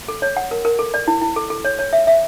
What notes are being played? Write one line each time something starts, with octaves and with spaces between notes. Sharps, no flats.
A4
C#5
F#5
A#4
A#4
A4
D5
E4
E4
A4
A4
C#5
C#5
E5
E5